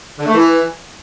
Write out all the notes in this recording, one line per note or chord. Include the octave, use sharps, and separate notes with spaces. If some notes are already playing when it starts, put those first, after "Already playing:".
D3
A3
E3